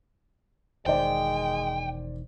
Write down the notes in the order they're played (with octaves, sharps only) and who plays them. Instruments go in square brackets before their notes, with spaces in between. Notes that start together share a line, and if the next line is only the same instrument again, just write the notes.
[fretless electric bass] E1 D#3 [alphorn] G#3 [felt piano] C5 D5 [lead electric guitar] G5